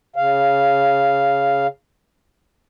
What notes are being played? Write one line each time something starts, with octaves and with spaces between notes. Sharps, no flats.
C#3 F5